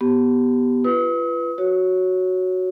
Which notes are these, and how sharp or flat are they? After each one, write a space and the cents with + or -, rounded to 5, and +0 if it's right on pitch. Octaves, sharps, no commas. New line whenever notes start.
B3 +0 G4 -10
F4 -35 B4 +0 D#6 +45
F#4 +0 C#5 +0